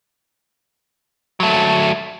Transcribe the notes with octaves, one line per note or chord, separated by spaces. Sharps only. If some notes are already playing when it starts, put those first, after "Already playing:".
F#3 A3